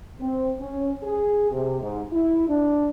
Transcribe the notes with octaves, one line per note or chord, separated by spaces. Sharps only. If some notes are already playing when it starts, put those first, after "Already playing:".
C4
C#4
G#4
C3
G#2
E4
D4